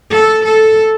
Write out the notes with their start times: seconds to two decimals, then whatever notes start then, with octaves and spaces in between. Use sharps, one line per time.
0.12 A4
0.45 A4